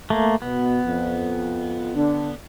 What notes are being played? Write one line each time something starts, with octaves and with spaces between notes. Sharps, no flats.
A3 A#3
B2 B3
F2
D3 D4